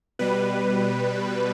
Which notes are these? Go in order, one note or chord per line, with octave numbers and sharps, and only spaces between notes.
B2 G3 B4